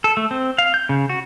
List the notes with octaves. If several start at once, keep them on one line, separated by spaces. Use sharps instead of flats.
A4
A3
C4
F5
G6
C#3
F#4